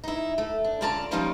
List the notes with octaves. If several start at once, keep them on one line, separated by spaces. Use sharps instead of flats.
D#4 E4
A3
D4
D3 C#4 F4 D5 A5 A#5
D#3 F3 G3 A#3 C#4 F4